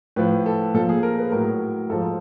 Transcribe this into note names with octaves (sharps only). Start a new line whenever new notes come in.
A2 F3 B4
A4
A#2 F3 A4
G#4
A#4
B4
A2 F#3 A#4
G#2 F3 A4